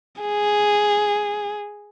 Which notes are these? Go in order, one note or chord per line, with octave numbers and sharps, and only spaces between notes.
G#4